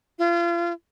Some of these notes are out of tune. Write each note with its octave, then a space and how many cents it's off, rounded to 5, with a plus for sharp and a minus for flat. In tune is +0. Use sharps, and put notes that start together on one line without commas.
F4 -35